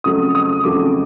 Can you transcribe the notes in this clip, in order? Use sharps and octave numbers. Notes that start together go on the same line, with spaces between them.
F2 C#3 F#3 A3 D#6
D#6
F2 C#3 F#3 A3 D6